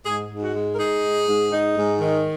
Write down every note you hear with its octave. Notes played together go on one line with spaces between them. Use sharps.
G#2 G#4
G#2
F#4
G#3
A#4
D#4 G#4
G#2
G#2
D#4
G#2
D#3